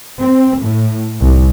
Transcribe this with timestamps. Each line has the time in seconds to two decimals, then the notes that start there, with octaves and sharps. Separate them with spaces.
0.21 C4
0.60 A2
1.20 C2